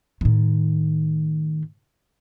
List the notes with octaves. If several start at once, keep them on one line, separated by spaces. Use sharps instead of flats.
A2 D#3